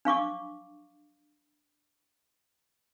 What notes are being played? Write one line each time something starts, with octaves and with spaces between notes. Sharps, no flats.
D4 F5 C#6 D6